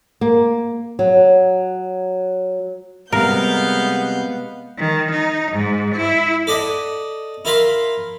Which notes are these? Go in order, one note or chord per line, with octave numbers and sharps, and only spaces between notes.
A#3
F#3
C3 G3 G#3 B3 A#4 F5 G6
D#3
D#4
G#2
E4
A4 D5 D#5 F#5
E4 F4 A#4 F5 B5 C6